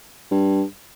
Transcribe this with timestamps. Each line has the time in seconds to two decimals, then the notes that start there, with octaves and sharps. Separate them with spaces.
0.31 G2